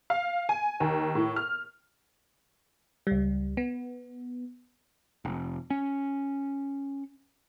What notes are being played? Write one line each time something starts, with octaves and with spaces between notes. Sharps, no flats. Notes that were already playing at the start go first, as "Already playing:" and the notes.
F5
G#5
D#2
A2
F6
C#2 G3
B3
F1
C#4